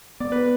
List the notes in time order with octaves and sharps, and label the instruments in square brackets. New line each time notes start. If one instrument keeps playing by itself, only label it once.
[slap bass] B3 [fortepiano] D5
[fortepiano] B4